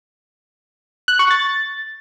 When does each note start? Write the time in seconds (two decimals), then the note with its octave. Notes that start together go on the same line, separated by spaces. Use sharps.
1.08 F#6
1.19 C#6
1.31 A6